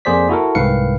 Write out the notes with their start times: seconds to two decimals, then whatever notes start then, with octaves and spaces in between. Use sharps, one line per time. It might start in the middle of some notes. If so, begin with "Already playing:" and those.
0.05 F2 A#3 G#4 C5 D5 B6
0.29 E4 F#4 A4 A#4
0.55 C2 G#2 D#3 B4 F5 C#7